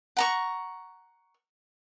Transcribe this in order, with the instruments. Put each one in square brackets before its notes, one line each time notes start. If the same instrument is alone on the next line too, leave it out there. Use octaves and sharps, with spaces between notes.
[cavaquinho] F#5 A#5 C#6